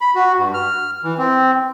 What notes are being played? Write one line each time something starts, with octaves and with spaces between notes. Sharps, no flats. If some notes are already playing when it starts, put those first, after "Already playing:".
B5
F#4
G2
F6
E3
C4